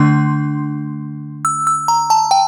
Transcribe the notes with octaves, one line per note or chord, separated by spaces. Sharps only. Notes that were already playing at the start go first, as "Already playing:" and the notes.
Already playing: D3 A3 D4 C6
E6
E6
A#5
A5
G5